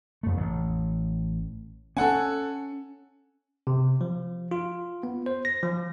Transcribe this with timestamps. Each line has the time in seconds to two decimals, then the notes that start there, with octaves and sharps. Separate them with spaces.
0.23 F2 A3
0.37 A1
1.97 C4 C#4 A4 F#5 G#5
3.67 C3
4.01 F3
4.51 F4
5.03 B3
5.26 C5
5.45 A#6
5.63 F3